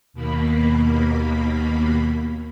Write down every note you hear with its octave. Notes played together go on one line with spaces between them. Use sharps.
D#2 B2 A#3 B5